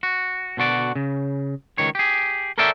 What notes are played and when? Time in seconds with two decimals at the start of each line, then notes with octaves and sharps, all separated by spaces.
0.03 F#4
0.57 B2 D3 F#4 D5
0.96 C#3
1.78 C#2 D#3 C#5
1.95 G4 G#4
2.58 A4 A#4 C#5 D5 E5 G5